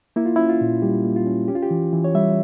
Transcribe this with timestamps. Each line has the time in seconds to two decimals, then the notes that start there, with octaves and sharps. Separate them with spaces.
0.16 A#3 E4
0.26 F4
0.36 C#4 E4
0.49 F4
0.61 A#2
0.82 G3 G4
1.04 A#3
1.16 F4
1.26 C#4
1.48 C#4 G4
1.55 F4
1.63 G4
1.70 E3
1.93 E3
2.04 C#5
2.15 G3 E5